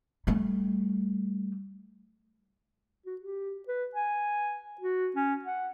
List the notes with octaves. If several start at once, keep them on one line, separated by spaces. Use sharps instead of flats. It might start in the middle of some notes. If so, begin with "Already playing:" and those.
G3 A3
F#4
G4
B4
G#5
F#4
C#4
F#5